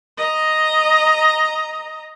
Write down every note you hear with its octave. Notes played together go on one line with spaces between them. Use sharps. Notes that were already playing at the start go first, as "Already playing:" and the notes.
D#5 A#5